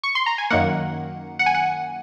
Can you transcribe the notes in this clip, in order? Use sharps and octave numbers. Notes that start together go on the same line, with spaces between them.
C#6
C6
A#5
G#5
F#2 D#3 A#3 F#5
F#5
G#5
F#5